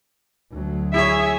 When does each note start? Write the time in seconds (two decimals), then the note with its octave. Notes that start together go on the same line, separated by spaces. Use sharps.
0.52 D2 F#3
0.94 E4 G#4 C#5 E5